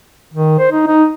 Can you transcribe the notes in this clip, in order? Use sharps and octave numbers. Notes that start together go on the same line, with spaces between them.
D#3
C5
D#4
D#4